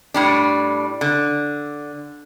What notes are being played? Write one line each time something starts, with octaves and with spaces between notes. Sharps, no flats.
A2 G3 D4
D3